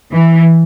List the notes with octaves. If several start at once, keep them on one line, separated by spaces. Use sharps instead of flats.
E3